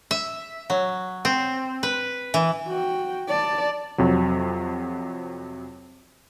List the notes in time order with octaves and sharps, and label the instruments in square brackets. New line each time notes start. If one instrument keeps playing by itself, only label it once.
[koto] E5
F#3
C4
B4
E3
[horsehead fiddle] F#4 G5
D5 A5
[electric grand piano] F2 C3 F#3